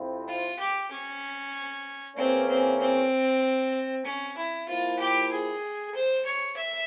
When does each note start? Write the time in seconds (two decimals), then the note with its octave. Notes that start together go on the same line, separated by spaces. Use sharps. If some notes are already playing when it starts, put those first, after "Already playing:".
Already playing: F2 C3 F3 C4 E4
0.27 F4
0.59 G4
0.91 C#4
2.16 E2 E3 A#3 C4 C#4
2.48 C4
2.80 C4
4.05 C#4
4.36 E4
4.68 F3 A#3 E4 F4
4.99 G4
5.31 G#4
5.94 C5
6.25 C#5
6.56 E5